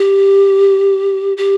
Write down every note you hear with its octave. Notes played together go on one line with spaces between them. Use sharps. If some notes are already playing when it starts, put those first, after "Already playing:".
Already playing: G4
G4